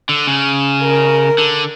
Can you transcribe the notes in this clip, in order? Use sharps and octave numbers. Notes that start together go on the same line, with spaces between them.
D3
C#3
A#4
D3